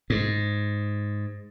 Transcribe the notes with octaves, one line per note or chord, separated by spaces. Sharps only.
G#2